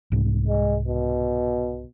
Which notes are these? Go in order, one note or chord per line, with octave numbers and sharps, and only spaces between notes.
C2 G#2
G#3
B2